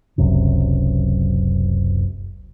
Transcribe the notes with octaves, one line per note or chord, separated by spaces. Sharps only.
F#1 C#2 F#2 C3